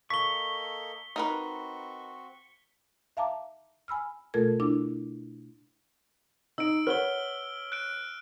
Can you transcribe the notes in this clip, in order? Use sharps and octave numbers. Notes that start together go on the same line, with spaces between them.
A#3 A4 D#5 C#6 B6 G7
C4 D#4 F#4 A#4 B4
E5 F5 A5 A#5 D6
G#5 B5 E6 F6
B2 A3 F4 A4 A#4 G#6
D4 E4 D6
D#4 E6 D7
B4 C#5 F#5 F6 G7
F#6 D7